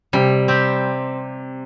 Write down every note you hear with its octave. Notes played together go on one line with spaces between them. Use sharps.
C3 G3
C4 G4